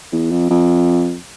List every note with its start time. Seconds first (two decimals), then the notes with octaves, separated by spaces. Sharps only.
0.12 E2
0.31 F2
0.50 F2